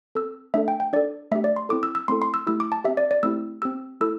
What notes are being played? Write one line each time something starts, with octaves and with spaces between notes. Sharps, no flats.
C4 A4 E6
A3 D4 A4 E5
G5
G5
D4 A4 D5
A3 D4 G4 E5
D5
C6
C4 E4 A4 D6
E6
E6
A3 C4 E4 A4 C6
C6
E6
A3 E4 G4 E6
D6
A5
C4 G4 E5
D5
D5
A3 C4 E4 G4 E6
C4 G4 E6
A3 E4 A4 E6